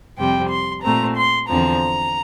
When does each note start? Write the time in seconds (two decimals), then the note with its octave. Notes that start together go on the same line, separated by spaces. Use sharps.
0.19 F2 C3 G3 C4 G5
0.51 C6
0.83 A#2 A3 C4 A#5
1.16 C6
1.49 E2 D3 F3 C4 A#5